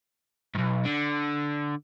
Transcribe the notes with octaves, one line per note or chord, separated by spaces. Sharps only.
B1 G#2
D3